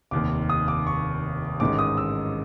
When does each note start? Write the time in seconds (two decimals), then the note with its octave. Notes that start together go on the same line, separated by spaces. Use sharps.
0.11 F1 D#2 D#3 D6
0.50 D#6
0.68 D6
0.87 C#6
1.60 A1 G#2 D#3 D6
1.79 D#6
1.97 E6